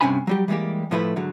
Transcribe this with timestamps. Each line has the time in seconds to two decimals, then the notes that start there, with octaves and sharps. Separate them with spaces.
0.01 G2 C3 C#4 D4 G#5 B5
0.27 F#3 G3 G4
0.48 E3 G3 G#3 A#3 G4
0.91 A2 F3 A3 E4 A#4 B4
1.16 G#2 D3 F#3